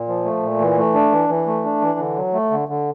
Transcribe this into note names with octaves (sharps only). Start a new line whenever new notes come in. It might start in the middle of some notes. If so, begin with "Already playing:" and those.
Already playing: A#2
F3
A3
A#2
E3
A3
D4
E3
E3
A3
D4
E3
D3
F#3
A3
D3
D3